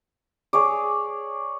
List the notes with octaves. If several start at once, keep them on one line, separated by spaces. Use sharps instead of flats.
G#4 C#5 D5